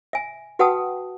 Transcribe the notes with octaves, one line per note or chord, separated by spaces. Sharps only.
E5 G#5
F#4 B4 F#5 G5 A5 D#6